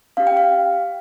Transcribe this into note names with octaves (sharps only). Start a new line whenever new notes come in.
C#4 G4 F5
G5
F5